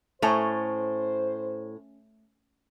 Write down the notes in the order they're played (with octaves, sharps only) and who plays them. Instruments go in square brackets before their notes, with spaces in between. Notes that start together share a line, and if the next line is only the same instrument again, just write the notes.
[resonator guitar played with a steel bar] A2 A#5 [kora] A3 C#4 [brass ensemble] C5